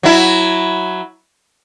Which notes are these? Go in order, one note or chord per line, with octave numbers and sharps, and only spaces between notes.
F#3 E4